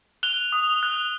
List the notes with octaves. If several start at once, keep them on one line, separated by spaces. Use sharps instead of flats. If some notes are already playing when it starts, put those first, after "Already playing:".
F#6 F7 G7
D#6
F#6